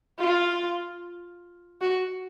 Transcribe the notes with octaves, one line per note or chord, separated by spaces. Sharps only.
F4
F#4